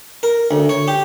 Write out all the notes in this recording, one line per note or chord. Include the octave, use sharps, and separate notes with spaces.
A#4
D2
C#5
G4